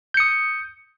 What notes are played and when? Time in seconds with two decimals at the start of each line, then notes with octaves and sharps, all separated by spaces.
0.14 G6
0.17 C#7
0.20 D#6